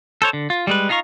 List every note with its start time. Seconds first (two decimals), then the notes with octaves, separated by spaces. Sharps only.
0.22 A4 C5 C#5
0.33 D3
0.50 F4
0.67 G3 G#3 B4
0.89 D#4 F4 F5 A#5 C#6